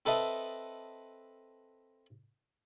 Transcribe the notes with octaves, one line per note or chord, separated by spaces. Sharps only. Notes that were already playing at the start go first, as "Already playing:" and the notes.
C4 A4 B4 D#5 E5